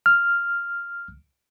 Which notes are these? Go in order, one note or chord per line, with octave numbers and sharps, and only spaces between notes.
F6